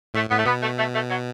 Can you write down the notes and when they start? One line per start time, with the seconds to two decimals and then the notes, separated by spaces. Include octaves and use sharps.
0.14 A2 A3
0.30 A2 B3
0.39 A3
0.46 B2 B3
0.62 A3
0.78 A3
0.94 A3
1.10 F#3